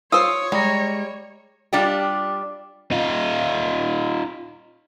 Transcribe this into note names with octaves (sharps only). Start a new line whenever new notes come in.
F4 C5 C#5 D#6 E6
G3 G#3 A#5
G3 D4 F4 G4
D#4 F4